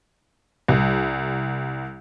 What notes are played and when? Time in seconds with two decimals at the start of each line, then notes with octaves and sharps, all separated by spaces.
0.68 C2